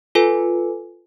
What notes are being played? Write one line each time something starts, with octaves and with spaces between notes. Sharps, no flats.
F4 A4 B4 G#5